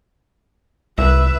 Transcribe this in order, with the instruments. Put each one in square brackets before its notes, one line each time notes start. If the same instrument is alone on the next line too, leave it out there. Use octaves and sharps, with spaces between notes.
[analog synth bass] C2 [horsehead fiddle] B4 E5